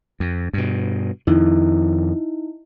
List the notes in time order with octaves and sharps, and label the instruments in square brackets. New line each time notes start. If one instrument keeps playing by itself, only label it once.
[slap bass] F2
G2 B2
[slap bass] F2 D#3 [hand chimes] D#4 E4